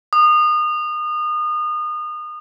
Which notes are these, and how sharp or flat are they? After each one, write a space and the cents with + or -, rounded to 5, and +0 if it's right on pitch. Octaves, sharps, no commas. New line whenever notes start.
D#6 -30